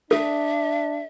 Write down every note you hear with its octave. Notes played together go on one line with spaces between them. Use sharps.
D4 A4 E5